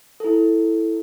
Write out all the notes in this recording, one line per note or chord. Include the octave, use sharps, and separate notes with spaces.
E4 A4